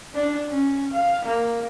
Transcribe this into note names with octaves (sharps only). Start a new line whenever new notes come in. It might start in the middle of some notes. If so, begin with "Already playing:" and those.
D4
C#4
F5
A#3